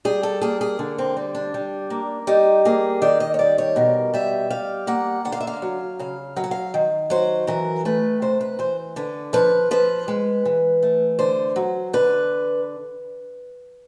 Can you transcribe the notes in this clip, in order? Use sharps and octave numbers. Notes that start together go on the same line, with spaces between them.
G3 G#4
A4
A#3 G#4
G#4
D3
C4
G3
D4
G3
A#3
G3 D#4
A#3 G#4
D#3 D5
D#5
C#5
G3 D5
C#5
B2 A#4
G3 E5
G3 F5
A#3 F#5
D3 F#5
F5
E5
F5
F#3
C#3 F5
F#3 F5
F#5
F5
D#3
F#3 C5
E3 A#4
A3 B4
C3 C5
B4
E3 C5
D3 B4
F3 B4
F3 B4
G#3
E3
A3
D3 C5
F#3
D3 B4